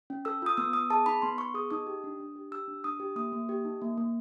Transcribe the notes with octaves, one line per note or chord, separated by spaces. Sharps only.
C#4
A4 E6
F4 D#6
B3 E6
B3 D#6
G#4 A5
D#4 B5
B3 C6
B3 C#6
G#4 D#6
D#4 D#6
G4
D4
D4
G4
G4 E6
D4
D4 D#6
G4
A#3 D#6
A#3
G4
D#4
A#3
A#3